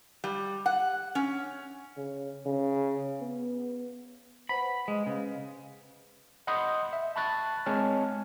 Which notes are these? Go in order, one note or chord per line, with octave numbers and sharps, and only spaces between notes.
G3
F#5
C#4
C#3
C#3
B3
B4 C5 F#5 B5
G#3
C#3 B4 F5
D#5 F#5 B5 C6 D#6 G6
E5
A5 B5 C#6 F#6 A6
G#3 C4 C#5 G#5 A5 F6